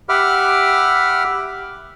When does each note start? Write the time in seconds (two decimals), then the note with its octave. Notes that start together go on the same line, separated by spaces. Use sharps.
0.09 G4 E5 F#5 B5 D6 F6